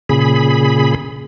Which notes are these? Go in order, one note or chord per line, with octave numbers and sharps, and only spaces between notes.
A#2 C#3 G#4 B5